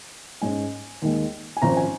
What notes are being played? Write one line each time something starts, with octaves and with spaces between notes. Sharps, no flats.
G#2 G#3 C#4 G#5
D#2 D#3 G#3
G#5
G#1 G#2 F3 C#4 A#5
G#5